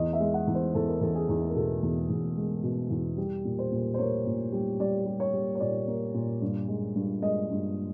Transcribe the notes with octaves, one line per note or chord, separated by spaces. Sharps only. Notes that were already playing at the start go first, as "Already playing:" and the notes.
Already playing: E2 D#5
E5
G#3
F#5
E2
C5
E2 A4
A#4
E2 A4
G#4
E2
A#4
B2 A4
E2
E2
G#3
B2
E2
G3
A#2
C5
A#2
C5
A#3 C#5
A#2
G3
G3 D5
G3
C#5
G3
C#5
A#2 D5
A#3
A#2
G2
G#3
G2
G#3 D#5
G2